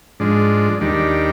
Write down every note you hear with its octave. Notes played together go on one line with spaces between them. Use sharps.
G#2 F3 G#3 D4
D#2 D#3 G3 D4